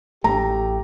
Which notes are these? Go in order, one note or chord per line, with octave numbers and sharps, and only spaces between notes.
A1 A3 G4 A#5